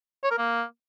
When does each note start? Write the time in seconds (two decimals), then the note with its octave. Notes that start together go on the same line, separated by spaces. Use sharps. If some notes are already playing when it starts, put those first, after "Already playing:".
0.24 C#5
0.31 A#4
0.38 A#3